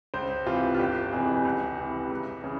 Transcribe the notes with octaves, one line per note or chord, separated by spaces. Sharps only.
C#2 C5
C3 E3 F4
F4
G1 G4
F2 C3 E3 G#4
C#2
C3 E3
C#2
C#3 E3